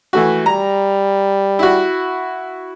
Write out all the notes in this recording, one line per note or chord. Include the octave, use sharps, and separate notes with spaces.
E3 A3 F#4
G3 A#5
E4 F#4